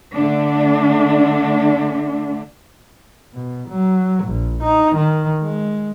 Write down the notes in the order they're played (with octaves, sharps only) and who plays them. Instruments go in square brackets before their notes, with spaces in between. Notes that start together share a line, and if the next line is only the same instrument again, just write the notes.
[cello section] D3 A3 D4
[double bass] B2
F#3
A#1
D#4
D#3
G#3